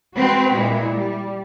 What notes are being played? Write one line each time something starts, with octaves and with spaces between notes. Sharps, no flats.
G#3 C4 F#4 B4
A#2 G#3 E4
G3